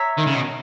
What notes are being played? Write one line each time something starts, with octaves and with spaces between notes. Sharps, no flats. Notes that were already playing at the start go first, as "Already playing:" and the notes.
Already playing: C#5 E5 A#5
D#3
C#3
B2